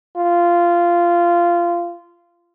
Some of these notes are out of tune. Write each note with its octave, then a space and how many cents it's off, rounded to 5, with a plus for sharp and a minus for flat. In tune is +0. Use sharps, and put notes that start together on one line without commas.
F4 -15